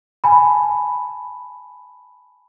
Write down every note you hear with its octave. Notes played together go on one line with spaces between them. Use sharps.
G#5 A5 B5